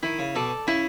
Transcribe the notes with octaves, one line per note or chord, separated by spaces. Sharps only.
D#3 E4
C#3
B2 A4 D5
C#3 E4